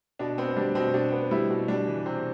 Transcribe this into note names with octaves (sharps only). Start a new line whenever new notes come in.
B2 D4
B3 C4
G3 D4
B2 C4
B2 D4
B3
G3 E4
B2
G3 D4
E3
C3 C4